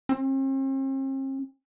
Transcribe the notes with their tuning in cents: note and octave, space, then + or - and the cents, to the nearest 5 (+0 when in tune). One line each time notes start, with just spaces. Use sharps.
C4 +45